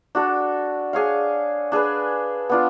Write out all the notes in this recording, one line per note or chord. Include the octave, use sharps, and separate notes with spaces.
D4 F#4 A4
D4 G#4 C#5 F5
D4 G#4 B4
B3 D4 F4